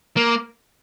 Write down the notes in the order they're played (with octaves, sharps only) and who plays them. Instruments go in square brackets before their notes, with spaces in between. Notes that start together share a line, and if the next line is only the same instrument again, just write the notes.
[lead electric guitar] A#3